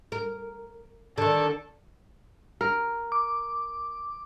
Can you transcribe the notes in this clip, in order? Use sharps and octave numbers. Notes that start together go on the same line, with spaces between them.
A#4
D3 D#3 A4
A#4
D6